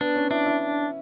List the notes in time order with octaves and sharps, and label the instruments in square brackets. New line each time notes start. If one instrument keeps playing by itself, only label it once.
[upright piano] B3 [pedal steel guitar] D4
[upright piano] C#4
[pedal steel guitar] D4 [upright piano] E4
[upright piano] E4